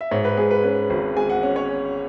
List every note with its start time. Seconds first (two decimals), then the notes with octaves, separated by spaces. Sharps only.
0.01 E5
0.11 G#2 C#5
0.25 B4
0.37 G#3 G#4
0.51 B4
0.64 C#4 B4
0.90 G#1
1.17 G#3 G#5
1.30 F#5
1.43 C#4
1.56 C#5
1.69 C#4